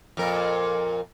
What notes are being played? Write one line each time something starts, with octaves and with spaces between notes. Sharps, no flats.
F2 A#2 A#4